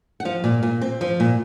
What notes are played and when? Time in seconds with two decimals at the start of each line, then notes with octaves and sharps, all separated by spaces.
0.20 F#5
0.25 F3 F5
0.44 A#2
0.63 A#2
0.81 C4
1.01 F3
1.20 A#2